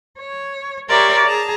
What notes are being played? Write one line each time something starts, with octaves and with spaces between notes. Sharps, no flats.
C#5
G4 A#4 C#5 D5 E5 C6
G#4 A5 A#5